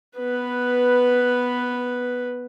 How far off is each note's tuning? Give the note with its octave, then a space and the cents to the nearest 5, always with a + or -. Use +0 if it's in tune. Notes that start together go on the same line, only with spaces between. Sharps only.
B3 +0 B4 +0